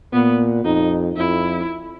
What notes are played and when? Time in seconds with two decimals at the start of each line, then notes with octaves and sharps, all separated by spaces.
0.13 A#2 B3
0.65 F2 D#4
1.17 F2 E4